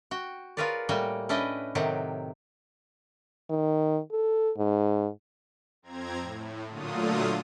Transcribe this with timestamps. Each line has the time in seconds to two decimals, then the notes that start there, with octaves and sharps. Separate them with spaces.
0.11 F#4 G5
0.57 F4 G#4 A#4 B4 C#5 D5
0.89 A2 G3 A#3 F#4 G5 G#5
1.29 C#4 D4 E4 B4 D#5 G5
1.75 A2 C3 D#3 F#3 G4 F#5
3.50 D#3
4.12 A4
4.57 G#2
5.82 F2 C4 A#5 G#6
6.21 A2
6.68 A#2 D3 F#3 A3 F4 D#6